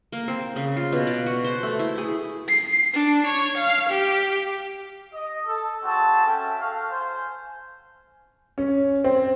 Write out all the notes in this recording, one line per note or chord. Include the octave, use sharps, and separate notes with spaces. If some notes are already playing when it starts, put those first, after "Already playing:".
A#3
C4
C#3
F4
B2
D5
F#4
C5
A3
E4
G#4
C7
D4
C#5
F5
G4
D#5
A4
C4 F#4 G#4 A5
C#4 A4 E5 G5
F#4 A4 F5
C5 G#5
C#4
C4